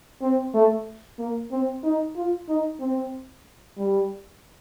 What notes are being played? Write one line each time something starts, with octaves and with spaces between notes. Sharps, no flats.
C4
A3
A#3
C4
D#4
F4
D#4
C4
G3